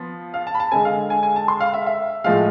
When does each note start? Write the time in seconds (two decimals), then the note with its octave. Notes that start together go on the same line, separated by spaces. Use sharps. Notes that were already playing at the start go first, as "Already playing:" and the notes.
Already playing: F3 B3
0.34 F5
0.47 A5
0.55 B5
0.60 A5
0.71 D3 G#3 C4 G#5
0.85 F5
1.10 G#5
1.23 G#5
1.36 A5
1.48 C6
1.60 F5
1.74 E5
1.86 E5
2.24 A2 F3 G#3 F5